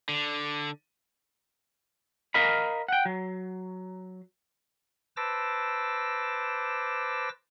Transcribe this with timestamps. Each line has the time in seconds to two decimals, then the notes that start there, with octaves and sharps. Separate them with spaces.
0.09 D3
2.34 A#4 D#5 F5 B5
2.88 F#5 G5
3.05 F#3
5.17 B4 C5 A5 D6 E6 A#6